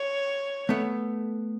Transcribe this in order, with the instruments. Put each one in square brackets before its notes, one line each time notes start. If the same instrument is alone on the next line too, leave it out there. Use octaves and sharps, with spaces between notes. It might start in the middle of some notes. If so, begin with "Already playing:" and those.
Already playing: [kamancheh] C#5
[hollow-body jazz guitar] A3 B3